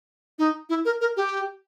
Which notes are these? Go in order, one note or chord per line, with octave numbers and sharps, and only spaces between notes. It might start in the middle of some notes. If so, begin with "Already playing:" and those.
D#4
E4
A#4
A#4
G4